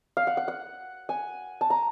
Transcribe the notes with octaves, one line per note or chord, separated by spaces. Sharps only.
F5
F#5
F#5
F#5
G#5
A5
A#5